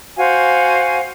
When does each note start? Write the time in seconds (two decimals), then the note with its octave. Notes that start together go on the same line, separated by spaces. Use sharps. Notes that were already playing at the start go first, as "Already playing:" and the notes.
0.17 F#4 C5 F5 G#5